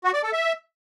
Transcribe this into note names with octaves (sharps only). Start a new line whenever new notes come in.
F#4
D5
A4
E5